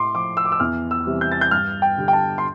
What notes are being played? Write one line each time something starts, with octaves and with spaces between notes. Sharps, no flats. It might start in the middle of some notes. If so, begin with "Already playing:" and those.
Already playing: A2 C6 D6
F3 D6
E6
D6
E6
E2 F6
E6
C3 E3 G3
G6
A6
G6
G2 F6
G5
D3 G3
G5
A5
C6